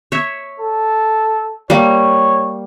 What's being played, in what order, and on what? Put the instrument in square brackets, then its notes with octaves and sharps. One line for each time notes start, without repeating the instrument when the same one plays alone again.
[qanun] C#5 E5
[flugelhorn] A4
[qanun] G3 A#3 [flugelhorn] C#5